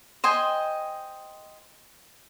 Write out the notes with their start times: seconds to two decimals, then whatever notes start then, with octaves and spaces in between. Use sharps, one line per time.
0.24 C5 D#5 G5 G#5